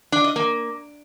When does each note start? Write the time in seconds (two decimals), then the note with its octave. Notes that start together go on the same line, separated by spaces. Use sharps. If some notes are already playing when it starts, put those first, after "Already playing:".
0.12 D4
0.24 D#5
0.36 A#3